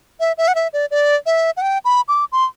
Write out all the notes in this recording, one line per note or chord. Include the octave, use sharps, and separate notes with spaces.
E5
E5
F#5
E5
D5
D5
E5
F#5
G5
B5
D6
C6